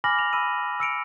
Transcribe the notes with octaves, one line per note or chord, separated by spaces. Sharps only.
G#5 B5 D6 F6 A#6 F#7
F7
B5 E6 D#7
E6 C#7 D7 F7